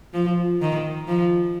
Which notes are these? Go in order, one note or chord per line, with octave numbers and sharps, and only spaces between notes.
F3
D#3
F3